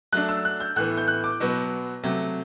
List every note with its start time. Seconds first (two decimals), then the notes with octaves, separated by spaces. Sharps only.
0.13 F#3 A3 D4 F#6
0.29 E6
0.45 F#6
0.60 G6
0.76 A2 E3 B3 F#6
0.97 G6
1.08 F#6
1.24 D6
1.40 B2 F#3 B3
2.04 C3 F#3 A3